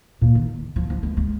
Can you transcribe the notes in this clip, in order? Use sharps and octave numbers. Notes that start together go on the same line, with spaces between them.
A#2
D#3
F3
F3
G#3
G#3